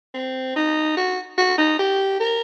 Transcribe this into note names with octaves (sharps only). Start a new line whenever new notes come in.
C4
D#4
F#4
F#4
D#4
G4
A#4